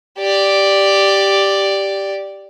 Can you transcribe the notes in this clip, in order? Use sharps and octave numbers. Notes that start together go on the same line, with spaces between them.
G4 D5